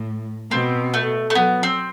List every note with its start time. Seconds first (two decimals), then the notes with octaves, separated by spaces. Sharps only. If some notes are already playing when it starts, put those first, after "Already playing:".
Already playing: A2
0.51 B2 C4
0.94 A3
1.30 A3
1.35 F#3 B3
1.63 C4